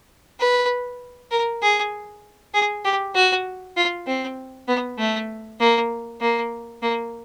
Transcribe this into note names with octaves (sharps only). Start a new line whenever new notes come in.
B4
A#4
G#4
G#4
G4
F#4
F4
C4
B3
A3
A#3
A#3
A#3